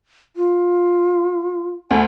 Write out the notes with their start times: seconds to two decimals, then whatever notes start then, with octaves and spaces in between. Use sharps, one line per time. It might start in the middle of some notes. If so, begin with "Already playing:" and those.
0.36 F4
1.91 D2 A3 G#5